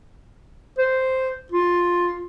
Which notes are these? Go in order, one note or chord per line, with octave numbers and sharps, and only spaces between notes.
C5
F4